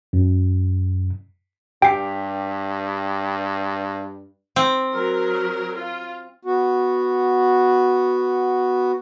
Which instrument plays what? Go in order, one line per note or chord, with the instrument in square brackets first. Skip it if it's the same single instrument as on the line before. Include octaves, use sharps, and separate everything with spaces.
[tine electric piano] F#2
[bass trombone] G2 [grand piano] G4 [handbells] G5 C7
[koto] C4
[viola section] F#3 A#4
F4
[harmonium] B3 F#4